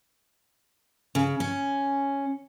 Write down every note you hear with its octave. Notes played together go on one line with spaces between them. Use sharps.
C#3
C#4